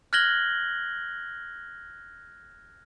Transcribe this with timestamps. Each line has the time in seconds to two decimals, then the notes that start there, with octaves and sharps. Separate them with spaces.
0.13 F6 F#6 G#6 A#6 F#7 G7